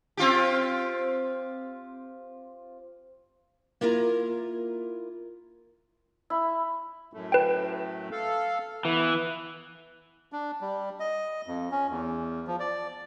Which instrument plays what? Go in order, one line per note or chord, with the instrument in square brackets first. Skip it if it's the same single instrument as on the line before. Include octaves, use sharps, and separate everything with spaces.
[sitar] C4 F4 G4
[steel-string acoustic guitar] A#3 E4 F4 A#4 A#5
[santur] E4
[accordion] F#2 A2 A3
[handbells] B4 G5
[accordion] A4 F5
[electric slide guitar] E3 [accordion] B3
[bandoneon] D4
G3
D#5
F2
C#4
E2
F3
D5